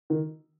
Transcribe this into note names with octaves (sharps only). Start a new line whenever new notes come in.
D#3